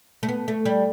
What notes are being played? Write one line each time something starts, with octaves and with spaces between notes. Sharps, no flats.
A3
B3
A3
G3